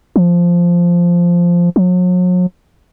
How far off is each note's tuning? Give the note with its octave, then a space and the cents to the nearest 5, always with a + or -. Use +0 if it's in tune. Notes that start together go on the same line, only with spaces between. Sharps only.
F3 -5
F#3 -40